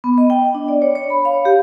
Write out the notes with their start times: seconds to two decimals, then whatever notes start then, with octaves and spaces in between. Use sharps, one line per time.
0.04 B3
0.18 D#5
0.30 G5
0.55 D4
0.68 D5
0.82 C#5
0.95 C#5
1.10 B5
1.25 F5
1.45 G4